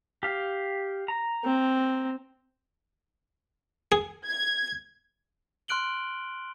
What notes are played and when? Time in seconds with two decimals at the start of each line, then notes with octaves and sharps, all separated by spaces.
0.23 G4 F5
1.08 A#5
1.44 C4
3.92 G#4
4.26 G#6
5.68 C6 F6 F#6 D7 F#7 G7